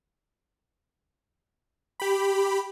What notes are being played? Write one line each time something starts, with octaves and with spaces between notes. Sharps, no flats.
G4 B5